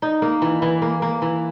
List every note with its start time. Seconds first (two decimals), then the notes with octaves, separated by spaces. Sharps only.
0.02 D#4
0.22 A#3
0.42 E3
0.62 E3
0.82 A#3
1.02 A#3
1.22 E3